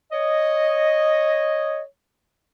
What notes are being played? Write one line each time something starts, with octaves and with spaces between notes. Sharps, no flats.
C#5 D#5